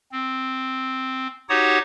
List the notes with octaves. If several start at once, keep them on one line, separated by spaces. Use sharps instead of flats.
C4
D#4 F#4 G4 C#5 F#5 D#6